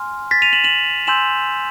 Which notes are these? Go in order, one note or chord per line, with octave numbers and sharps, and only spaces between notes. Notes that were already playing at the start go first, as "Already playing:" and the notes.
Already playing: G#5 C6 F6
A6 B6
D#7 F7
E7 F#7
E7 F#7
G#5 C6 E6 G6 E7 F#7